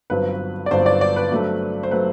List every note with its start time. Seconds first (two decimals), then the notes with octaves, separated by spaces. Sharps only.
0.10 G1 G2 F#3 C4 B4
0.66 D5
0.71 G1 G2 F#3 C4 C5
0.86 D5
1.01 D5
1.16 B4
1.31 G2 F#3 A3 C4
1.83 C5
1.91 F#3 A3 C4 B4